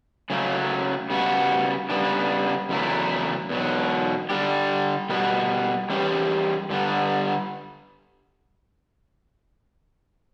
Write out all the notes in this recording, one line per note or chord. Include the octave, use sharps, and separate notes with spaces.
C#3 F#3 A3 C#4
C#3 G3 B3 F#4
C#3 G3 B3 D4
E2 C#3 F#3 A3 E4
E2 B2 F#3
D3 G3 D4 G4
B2 G3 B3 F#4
E3 G3 C#4 G4
G2 D3 G3 B3